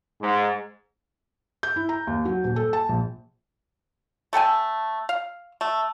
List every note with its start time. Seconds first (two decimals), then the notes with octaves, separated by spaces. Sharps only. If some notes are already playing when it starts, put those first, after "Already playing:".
0.22 G#2
1.63 G6
1.76 E4
1.89 A#5
2.07 D#2
2.25 F#3
2.44 D#1
2.56 A4
2.73 A5
2.89 A#1
4.33 A3 A4 G5 G#5
5.09 F5
5.61 A3